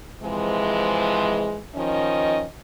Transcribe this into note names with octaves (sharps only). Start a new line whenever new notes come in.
C3 E3 F3 G#3
D#3 F3 C#4 D#5